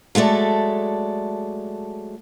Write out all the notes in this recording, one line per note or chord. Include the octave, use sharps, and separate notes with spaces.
F#3 G#3 A3 A4 D5